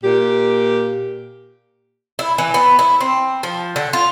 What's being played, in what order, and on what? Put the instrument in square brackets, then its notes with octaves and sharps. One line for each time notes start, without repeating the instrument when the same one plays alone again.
[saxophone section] A#2 G4
[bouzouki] E4
E3
B3
E4
C4
F3
D3
F4